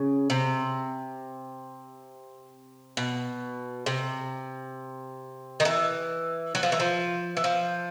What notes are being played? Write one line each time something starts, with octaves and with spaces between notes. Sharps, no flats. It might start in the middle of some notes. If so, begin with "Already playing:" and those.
Already playing: C#3
C3
B2
C3
D#3
E3
F#3
F3
E3
F3
E3
F3